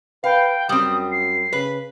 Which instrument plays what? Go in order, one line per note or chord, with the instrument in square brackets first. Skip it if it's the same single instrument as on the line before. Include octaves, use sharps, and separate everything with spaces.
[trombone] B4 [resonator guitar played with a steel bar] F5 [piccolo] G5
[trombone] F#2 [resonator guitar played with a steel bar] G3 C4 [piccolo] D#6
[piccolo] C7
[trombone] C#3 [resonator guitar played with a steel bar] B4